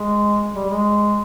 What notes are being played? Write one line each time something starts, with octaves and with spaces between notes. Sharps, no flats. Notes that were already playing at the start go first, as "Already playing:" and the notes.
Already playing: G#3
G3
G#3